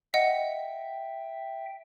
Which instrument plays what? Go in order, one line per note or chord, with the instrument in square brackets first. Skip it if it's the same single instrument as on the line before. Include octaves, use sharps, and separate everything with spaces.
[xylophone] D#5 F#5 [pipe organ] E5 G5